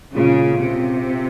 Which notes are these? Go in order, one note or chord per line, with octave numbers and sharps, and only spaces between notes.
A#2 C#3 G#3 C#4 F4
C3